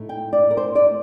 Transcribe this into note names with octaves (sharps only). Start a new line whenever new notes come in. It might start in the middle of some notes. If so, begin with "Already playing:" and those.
Already playing: A2 A3 D#4
G5
D5
A#4
C5
D5